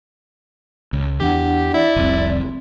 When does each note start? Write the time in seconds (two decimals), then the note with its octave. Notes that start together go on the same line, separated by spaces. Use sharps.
0.93 C#2
1.20 E2 D4 G4 F#5
1.74 E4 D5
1.96 F1 C2 C4